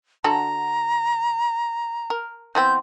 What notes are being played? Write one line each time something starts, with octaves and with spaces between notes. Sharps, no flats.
D3 F#4 A4 A#5
A#4
E3 B3 C4 G6